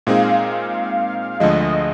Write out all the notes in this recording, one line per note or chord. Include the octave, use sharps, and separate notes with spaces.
A#2 G#3 C4 D#4 G#4 F5
D2 D3 F3 G#3 D#5